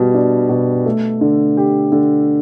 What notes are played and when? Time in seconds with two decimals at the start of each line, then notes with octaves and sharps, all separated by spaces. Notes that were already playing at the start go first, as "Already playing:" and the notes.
Already playing: B2 G3
0.14 D4
0.49 B2
0.85 A3
1.21 D3
1.57 G4
1.92 D3